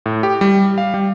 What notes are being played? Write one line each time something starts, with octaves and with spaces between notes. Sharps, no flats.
A2
G4
G3
F5
G3